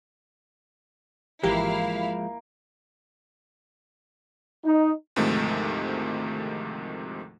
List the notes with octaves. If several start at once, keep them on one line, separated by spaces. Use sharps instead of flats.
G#1 E3 F3 G#3 A#3 E4 G4 F5
D#4
D2 G#2 C3 D#3 F3 A3